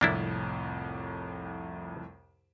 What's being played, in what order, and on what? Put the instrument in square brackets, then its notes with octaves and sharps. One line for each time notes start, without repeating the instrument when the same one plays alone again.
[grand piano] C2 F2 A2 [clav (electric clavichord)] A#3 D4 E4